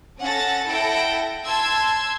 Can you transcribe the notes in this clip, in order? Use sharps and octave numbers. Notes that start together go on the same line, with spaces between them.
C#4 A4 F#5 A6 A#6
E4 A4 F#5 G5 A#6
A5 C6 E6 G#6